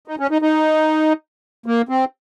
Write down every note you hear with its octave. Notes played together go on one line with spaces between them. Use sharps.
D#4
C#4
D#4
D#4
A#3
C4